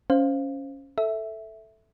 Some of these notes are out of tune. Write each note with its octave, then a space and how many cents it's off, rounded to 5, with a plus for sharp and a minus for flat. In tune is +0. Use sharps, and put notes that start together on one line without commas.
C#4 +0 C5 +0 F5 +0
A4 +0 E5 -5